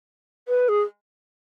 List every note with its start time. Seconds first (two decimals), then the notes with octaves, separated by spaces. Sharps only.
0.48 B4
0.69 G#4